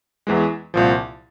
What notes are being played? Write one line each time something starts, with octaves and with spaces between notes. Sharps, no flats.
E2 E3 G#3
C2 A#2 F3